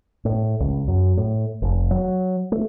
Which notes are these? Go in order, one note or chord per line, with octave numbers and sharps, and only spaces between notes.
A2
C#2
F#2
A2
F1
F#3
A3